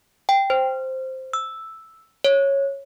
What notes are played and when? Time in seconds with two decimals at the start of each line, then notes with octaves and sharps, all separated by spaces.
0.29 G5
0.50 C5
1.33 E6
2.24 C#5